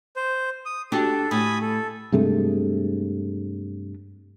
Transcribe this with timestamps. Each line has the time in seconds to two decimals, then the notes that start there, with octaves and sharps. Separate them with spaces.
0.16 C5
0.66 D#6
0.92 D4 F#4 G4 A4
1.31 A2 G#5 B5 D#6
1.62 A4
2.12 G2 C3 G#3 A3